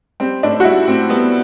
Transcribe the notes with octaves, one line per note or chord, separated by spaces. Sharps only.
G3 C4
A2 D4
F#4
G3 E4
A2 C4
G3 B3